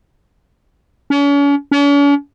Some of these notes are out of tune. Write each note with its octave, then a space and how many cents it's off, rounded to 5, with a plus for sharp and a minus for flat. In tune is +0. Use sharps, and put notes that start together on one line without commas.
C#4 +40
C#4 +45